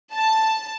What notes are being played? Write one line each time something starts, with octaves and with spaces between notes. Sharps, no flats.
A5